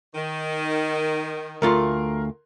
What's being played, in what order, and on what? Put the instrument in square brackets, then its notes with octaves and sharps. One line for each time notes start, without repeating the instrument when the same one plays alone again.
[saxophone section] D#3
[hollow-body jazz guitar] D2 A3 F4 [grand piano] A#4 C6